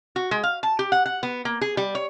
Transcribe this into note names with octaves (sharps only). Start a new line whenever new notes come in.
F#4
G#3
F5
A5
G4
F#5
F#5
B3
A#3
G#4
G3
C#5